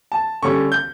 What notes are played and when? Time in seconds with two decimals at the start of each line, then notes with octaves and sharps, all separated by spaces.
0.12 A5
0.43 D3 G3 C#4 C#6
0.72 G6